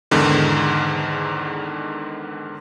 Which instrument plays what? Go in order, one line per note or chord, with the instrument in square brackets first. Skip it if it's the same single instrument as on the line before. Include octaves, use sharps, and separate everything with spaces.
[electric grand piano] E2 G#2 D3 D#3